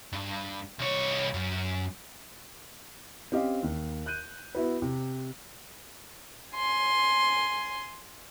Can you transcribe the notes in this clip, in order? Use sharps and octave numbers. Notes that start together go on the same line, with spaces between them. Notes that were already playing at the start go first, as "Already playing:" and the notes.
G2
C2 C#5
F#2
C4 C#4 G4 D#5 F5
D#2
F#6 G6 D#7
B3 E4 F#4 B4
C3
G#5 C6